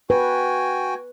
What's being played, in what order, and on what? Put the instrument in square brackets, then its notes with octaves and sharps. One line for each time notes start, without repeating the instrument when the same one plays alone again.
[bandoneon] F#4 G5 G#5 [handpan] B4